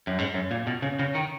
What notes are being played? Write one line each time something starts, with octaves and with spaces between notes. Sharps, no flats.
F#2
G#2
F#2
A#2
B2
C#3
C#3
D#3